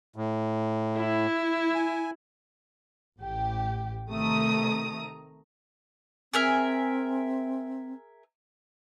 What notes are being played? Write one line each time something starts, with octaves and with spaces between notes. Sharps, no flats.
A2
E4
G#5
A1 G4
C3 D#3 A3 A#5 D#6
C4 G#4 A#4 E5